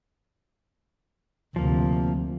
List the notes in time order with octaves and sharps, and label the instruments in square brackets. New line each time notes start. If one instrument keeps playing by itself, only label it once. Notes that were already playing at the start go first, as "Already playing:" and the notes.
[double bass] D2 C3 [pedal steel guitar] F3 A#3